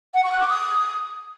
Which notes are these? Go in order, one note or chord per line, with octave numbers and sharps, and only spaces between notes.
F#5
C#6
F#6
D6
D#6